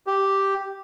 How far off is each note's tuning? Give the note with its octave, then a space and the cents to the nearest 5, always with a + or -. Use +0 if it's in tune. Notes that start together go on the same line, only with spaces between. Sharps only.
G4 -5